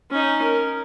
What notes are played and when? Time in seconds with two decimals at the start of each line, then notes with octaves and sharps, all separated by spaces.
0.11 C#4 D#4
0.42 A#4